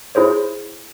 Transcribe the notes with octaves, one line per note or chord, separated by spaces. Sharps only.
E4 G#4 C5 C#5